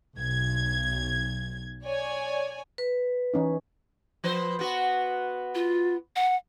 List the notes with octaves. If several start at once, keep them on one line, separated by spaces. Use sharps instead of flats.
B1 G#6
C#5 D5 G#5
B4
E3 C#4 D#4
F3 B4 C5
B3 F#4
F4
F#5